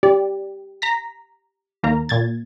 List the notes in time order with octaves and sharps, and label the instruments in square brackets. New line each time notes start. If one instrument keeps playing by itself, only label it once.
[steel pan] G4 [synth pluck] D5
[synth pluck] A#5 A#6 B6
D#2 A#3 A#5
A#2 G#6 A6